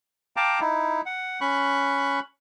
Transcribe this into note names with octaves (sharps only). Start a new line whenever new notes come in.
F5 G5 A5 A#5 D6
D#4 E4
F#5
C#4 B5 C#6 F#6